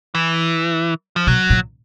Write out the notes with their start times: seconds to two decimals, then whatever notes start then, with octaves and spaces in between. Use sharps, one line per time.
0.15 E3
1.16 F3
1.27 B2 F#3
1.50 A#2